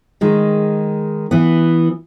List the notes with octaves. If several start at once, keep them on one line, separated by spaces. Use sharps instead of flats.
D#3 G#3
E3 B3